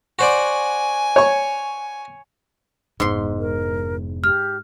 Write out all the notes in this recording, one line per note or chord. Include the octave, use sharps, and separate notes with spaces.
F#4 C5 D5 G#5
C#5 C#6
F1 G#2 B3 C6
A#4
G4 F6